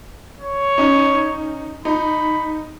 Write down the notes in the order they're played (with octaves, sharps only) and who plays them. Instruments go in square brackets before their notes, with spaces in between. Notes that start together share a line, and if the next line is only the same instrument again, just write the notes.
[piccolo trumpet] C#5
[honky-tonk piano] C#4 D#4
[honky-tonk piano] D#4 [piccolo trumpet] B5